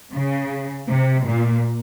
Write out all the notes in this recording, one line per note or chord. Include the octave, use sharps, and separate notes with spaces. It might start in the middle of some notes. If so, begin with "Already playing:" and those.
C#3
C3
A#2